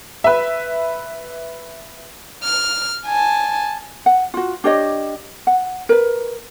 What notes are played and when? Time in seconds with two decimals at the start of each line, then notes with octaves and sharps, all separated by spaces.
0.24 B4 E5
2.44 F6
3.06 G#5 A5
4.06 F#5
4.34 F4 F#4
4.64 D4 G4 C#5 D#5
5.47 F#5
5.89 A#4 B4